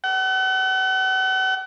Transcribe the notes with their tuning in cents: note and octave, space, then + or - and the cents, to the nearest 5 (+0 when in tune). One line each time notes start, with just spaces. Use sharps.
F#5 +40